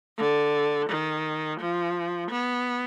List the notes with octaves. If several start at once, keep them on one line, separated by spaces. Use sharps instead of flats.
D3
D#3
F3
B3